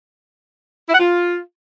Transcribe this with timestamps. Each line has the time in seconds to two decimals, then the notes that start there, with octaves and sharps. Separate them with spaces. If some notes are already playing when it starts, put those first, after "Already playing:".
0.89 E4
0.94 F#5
0.99 F4